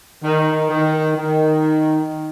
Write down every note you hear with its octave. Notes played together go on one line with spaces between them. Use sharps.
D#3
D#3
D#3